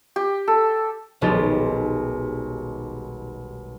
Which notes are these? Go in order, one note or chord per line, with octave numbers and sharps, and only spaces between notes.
G4
A4
D#1 B1 G#3 F4 G4 A6